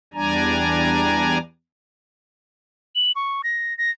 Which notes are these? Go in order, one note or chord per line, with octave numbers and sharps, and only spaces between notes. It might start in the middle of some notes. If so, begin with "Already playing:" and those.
E2 G3 D4 D5 G#5 A#5
F#7
C#6
A#6
A#6